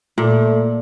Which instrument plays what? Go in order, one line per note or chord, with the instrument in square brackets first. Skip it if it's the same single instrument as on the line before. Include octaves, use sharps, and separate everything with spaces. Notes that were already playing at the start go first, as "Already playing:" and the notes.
[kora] A#2 [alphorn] A3